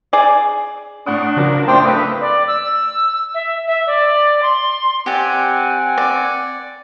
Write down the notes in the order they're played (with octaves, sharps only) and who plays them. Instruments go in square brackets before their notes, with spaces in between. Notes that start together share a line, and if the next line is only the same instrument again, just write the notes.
[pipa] G#4 D5
[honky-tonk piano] A2 F#5 D#6 [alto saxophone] D4
[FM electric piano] C#3 [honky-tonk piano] F3 F#3 A#4
[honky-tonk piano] F#2 A2 [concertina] C5 G5 [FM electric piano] E5 D6 D#6
[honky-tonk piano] A3 A#3 [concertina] B4 [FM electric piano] D#6 E6 B6
[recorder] D5
E6
E5
E5
D5
C6
[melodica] C4 F#5 G#5 [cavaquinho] G4 D5
[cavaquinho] D5